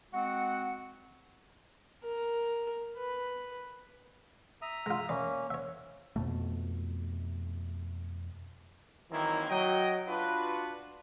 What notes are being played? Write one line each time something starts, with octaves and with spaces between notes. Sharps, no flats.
G#3 C4 F#4 F#5
A#4
B4
E5 A#5 D#6
G#3 F4
A#3 C#4 D5 B5
C#5 E5
F2 B2 A3
D#3 E3 F#3 A#3 C4 E4
F#3 D#5 G5
D4 F4 F#4 B4